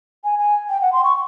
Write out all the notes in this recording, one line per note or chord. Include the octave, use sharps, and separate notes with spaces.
G#5
G#5
G5
F#5
C6
C#6